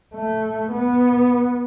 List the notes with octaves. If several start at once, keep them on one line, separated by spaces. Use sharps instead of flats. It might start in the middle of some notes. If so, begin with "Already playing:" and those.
A3
B3